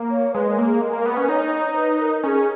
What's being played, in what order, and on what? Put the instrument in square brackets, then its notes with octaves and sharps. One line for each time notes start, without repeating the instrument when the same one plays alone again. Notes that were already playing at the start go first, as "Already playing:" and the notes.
Already playing: [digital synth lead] A#3
[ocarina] C#5
[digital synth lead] G#3 [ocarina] B4
[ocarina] A#4
[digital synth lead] A#3
[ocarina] G#4
[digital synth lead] G#3 [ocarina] A#4
[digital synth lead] A#3 [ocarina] A#4
[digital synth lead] B3
[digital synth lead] C#4 [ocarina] B4
[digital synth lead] D#4 [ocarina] C#5
[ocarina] D#5
C#5
B4
A#4
[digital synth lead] C#4 [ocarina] G#4 A#4